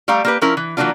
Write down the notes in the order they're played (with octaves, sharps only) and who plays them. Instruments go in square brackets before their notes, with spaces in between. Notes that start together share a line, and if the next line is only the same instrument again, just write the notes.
[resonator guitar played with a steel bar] G3 A3 G4 F5 A#5
A#3 G4 B4
F3 C#4 E4 A#4
E3
E3 F#3 G3 A#3 D4 F4